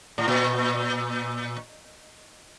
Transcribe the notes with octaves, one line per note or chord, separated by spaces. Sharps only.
A2
A#2